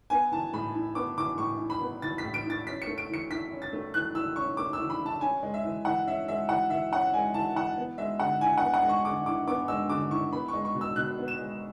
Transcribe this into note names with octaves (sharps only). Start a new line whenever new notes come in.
B3 G#5
E3 A5
A2 B5
E4
B3 D6
E3 D6
A2 C#6
E4
B5
B3
E3 A6
B6
A2
D7
E4 A6
C#4 B6
C#7
A3
D7
E3 C#7
E4 B6
C#4
A6
A3
E3 F#6
E4 E6
C#4 C#6
A3 D6
E6
E3
B5
E4 A5
C#4 G#5
G#3
E5
E3
E3 F#5
C#4 E5
G#3 E5
E3 F#5
E3 E5
C#4 F#5
G#3 G#5
E3 A5
E3 F#5
B3
G#3 E5
D3 F#5
E4 G#5
B3 F#5
F#5
G#3
C#6
D3 D6
E4 D6
B3 D6
G#3 E6
D3 D6
E4 C#6
B3 B5
C#6
G#3
C#6
B2
E6
B2 F#6
B3
E7
G#3